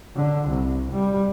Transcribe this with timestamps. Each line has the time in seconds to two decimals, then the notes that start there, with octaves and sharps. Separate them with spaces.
0.16 D3
0.48 C2
0.91 G3